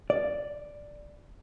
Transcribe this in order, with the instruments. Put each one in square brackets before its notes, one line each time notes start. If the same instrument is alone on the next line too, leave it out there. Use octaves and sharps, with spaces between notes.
[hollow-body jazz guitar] D5